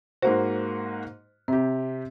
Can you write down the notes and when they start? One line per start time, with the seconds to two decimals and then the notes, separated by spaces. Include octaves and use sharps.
0.22 G#2 A#3 F#4 C5
1.48 C3 C4 G4